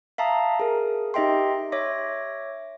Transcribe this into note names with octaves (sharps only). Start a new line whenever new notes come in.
E5 F5 A5 A#5 D#6
G#4 A#4
D#4 G4 D#5 E5 G5 C6
C#5 E5 D6 A#6